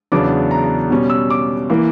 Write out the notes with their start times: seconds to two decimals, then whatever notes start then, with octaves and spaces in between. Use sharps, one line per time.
0.12 E2 C#3 F#3 B3 D4 D6
0.51 A#5
0.64 A#5
0.91 B2 G3 C#4
1.10 E6
1.30 D6
1.70 E3 A#3